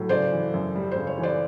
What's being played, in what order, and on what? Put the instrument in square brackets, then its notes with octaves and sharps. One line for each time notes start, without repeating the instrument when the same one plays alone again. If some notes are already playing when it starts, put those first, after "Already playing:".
Already playing: [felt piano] A2 F#3
C#3 C5 D5
E3
F#2
G3
C#3 C5
C#5
E3
C5 D5